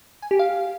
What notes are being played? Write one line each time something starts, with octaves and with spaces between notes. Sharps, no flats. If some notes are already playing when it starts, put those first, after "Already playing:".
G#5
G4
F5